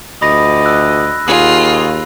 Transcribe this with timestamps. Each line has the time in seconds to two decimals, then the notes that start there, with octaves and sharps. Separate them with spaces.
0.22 D2 F3 D5 D#5 B5 A#6
0.65 E6 F#6
1.27 D#2 F4 F#4 G#4